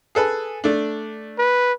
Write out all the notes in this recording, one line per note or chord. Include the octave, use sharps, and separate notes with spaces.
G#4 A4 B4
A3 D4
B4